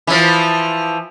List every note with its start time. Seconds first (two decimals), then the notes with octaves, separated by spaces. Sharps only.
0.07 E3 F3